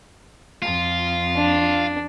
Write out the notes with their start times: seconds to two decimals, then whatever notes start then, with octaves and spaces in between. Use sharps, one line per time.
0.62 F2 F4
1.37 D4